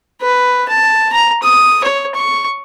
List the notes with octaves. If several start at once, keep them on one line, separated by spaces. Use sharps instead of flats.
B4
A5
A#5
D#6
C#5
C#6